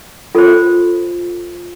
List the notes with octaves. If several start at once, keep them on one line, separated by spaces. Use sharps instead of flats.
F4 A4 C5